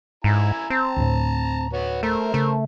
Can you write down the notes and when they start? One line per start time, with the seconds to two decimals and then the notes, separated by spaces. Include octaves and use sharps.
0.24 G#2 E4 G#5 A#5
0.70 C4 A5 A#5
0.96 D2 A2
1.73 B3 F#4 C#5
2.03 A3 A#4 C5 E5
2.34 C#3 A3